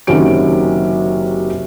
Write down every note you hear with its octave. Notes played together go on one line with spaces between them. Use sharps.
F#1 C3 D#3 F#3 C#4 D7